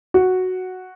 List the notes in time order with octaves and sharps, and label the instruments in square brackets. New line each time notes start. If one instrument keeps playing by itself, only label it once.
[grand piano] F#4